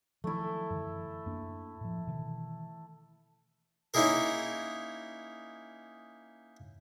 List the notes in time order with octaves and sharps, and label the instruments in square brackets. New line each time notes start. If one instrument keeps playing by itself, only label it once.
[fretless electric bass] D#3 F3 F#3 [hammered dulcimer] A3 E4
[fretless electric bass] F#2 D3 E3
F#2 A#3 D4
A2 F3
B2 D#3 E3
[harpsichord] A#3 C#4 D#4 E4 G#4 A#4